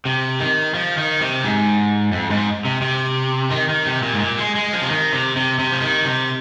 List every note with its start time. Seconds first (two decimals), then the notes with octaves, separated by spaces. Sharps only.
0.05 C3
0.40 D#3
0.74 F3
0.98 D#3
1.21 C3
1.44 G#2
2.12 F2
2.30 G#2
2.65 C3
2.82 C3
3.51 D#3
3.69 D#3
3.86 C3
4.03 A#2
4.14 G#2
4.20 A#2
4.38 G#3
4.55 G#3
4.73 F3
4.82 C3
4.90 D#3
5.13 C3
5.36 C3
5.59 C3
5.72 F3
5.81 D#3
6.05 C3